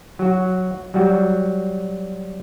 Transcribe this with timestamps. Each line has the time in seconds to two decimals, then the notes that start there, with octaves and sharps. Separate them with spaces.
0.19 F#3 F#4
0.94 F#3 G3 F#4